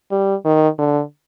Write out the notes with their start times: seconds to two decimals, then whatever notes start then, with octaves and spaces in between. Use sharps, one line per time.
0.12 G3
0.45 D#3
0.79 D3